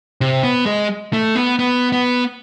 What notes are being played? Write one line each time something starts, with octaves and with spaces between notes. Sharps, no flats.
C3
B3
G#3
A3
B3
B3
B3